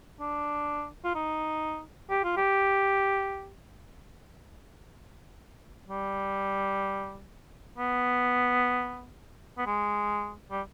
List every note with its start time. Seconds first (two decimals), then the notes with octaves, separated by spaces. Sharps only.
0.20 D4
1.05 F4
1.15 D#4
2.10 G4
2.24 F4
2.37 G4
5.89 G3
7.78 B3
9.58 B3
9.67 G#3
10.51 G3